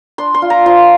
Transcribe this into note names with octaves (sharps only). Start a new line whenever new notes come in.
D4 C6
C6
F4
A#5
F3 C6